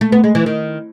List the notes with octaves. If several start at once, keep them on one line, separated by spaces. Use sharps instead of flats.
A3
B3
G#3
E3
D#3